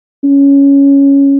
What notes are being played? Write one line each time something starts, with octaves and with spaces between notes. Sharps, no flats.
C#4